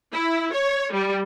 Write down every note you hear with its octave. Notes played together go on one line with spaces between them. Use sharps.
E4
C#5
G3